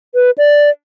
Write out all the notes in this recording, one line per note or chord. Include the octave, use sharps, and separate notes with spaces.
B4
D5